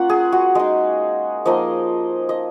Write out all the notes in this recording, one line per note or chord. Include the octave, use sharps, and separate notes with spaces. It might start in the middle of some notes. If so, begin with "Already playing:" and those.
Already playing: A#3 C#4 F4 F#5 A#5
G#4
F#4
G#3 D#4 D#5
F3 A#3 D#4 D#5
D#5